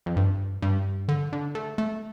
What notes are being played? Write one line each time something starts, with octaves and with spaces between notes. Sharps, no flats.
F2
G2
G2
D3
D3
A3
A3